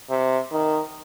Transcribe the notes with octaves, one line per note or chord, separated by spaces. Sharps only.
C3
D#3